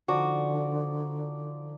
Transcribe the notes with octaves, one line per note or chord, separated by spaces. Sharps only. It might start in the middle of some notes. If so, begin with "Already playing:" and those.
D3 F3 D#4 F#4 D5